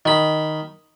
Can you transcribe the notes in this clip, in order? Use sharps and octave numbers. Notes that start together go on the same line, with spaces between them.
D#3 B5